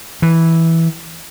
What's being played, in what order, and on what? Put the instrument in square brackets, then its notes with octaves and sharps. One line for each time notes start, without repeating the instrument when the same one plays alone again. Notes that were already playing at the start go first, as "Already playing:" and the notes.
[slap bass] E3